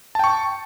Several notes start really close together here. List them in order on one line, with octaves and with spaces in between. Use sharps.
A5 G5 C#6